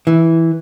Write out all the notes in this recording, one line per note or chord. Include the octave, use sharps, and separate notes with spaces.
E3